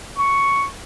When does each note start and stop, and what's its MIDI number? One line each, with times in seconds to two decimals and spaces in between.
0.16 0.67 85